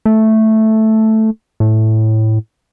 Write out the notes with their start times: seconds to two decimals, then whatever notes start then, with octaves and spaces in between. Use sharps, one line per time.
0.06 A3
1.60 A2